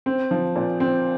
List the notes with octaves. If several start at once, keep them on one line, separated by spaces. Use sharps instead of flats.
C4
F3
A#2
C4